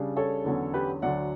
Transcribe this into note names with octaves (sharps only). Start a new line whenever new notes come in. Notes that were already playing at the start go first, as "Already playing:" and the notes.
Already playing: C#3 G3 D4
A4 C#5
E2 D3 F#3 C#4
G4 B4
D2 D3 F#3 D5 F#5